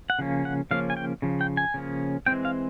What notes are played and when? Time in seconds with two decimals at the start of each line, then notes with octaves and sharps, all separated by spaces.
0.10 F#5
0.19 C#3 F3 A#3 C#4
0.45 F#5
0.71 C#3 F3 A#3 C#4 F5
0.90 G#5
0.97 G5
1.22 C#3 F3
1.41 G5
1.57 G#5
1.74 C#3 F3 A#3 C#4
2.26 E3 G#3 C4 G5
2.45 F5